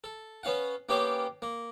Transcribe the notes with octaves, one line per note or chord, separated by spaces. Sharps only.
A4
B3 C#4 F5 F#5
A#3 B3 C#4 G4 F5 G5
A#3